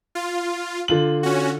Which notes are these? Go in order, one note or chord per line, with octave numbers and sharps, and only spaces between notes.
F4
D3 F4 F#7
C#4 F#4